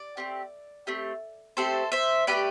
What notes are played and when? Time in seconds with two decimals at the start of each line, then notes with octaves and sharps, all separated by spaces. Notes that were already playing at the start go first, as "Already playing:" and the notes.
Already playing: D5
0.17 A3 C4 G4
0.87 A3 C4 G4
1.57 A3 C4 G4 A4 C5
1.92 C5 E5
2.27 A3 E4 G4 B4 D5